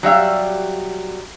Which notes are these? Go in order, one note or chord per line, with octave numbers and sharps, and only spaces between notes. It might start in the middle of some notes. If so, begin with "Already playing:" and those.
F#3 G3 E5 F5